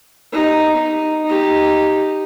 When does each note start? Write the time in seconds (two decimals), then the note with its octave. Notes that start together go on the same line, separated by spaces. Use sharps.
0.33 D#4 G4
0.76 D#4
1.25 D#4 G4